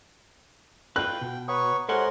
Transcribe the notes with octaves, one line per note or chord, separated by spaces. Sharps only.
F4 B4 G5 F#6
B2
B4 C#5 F#5 A#5 C#6 D#6
G#3 G4 A4 A#4 C5 C#5 F#5 C6